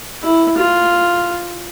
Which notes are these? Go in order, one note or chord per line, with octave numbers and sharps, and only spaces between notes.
E4
F4